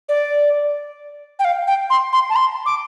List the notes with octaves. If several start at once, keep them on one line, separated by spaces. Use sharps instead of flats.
D5
G5
F5
G5
C6
C6
A5
C6
D6